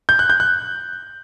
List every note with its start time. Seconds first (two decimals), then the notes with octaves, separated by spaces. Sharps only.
0.09 G6
0.19 F#6
0.30 G6
0.40 F#6